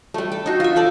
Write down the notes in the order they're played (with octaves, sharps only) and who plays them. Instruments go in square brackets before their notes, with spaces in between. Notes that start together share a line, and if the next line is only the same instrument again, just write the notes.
[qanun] G3 A3
A4
D#4 F#4
F4 E5
D#4 A4 D5